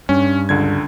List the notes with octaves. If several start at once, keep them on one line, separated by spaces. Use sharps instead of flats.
G2 C#4
C#2 D3 G#6